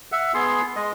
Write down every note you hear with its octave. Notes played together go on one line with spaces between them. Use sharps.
E5 F#5
B3 G#4 C6
G#3 D#5